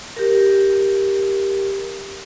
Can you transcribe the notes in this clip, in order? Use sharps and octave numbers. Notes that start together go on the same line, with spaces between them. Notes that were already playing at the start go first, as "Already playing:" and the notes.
G4 A#4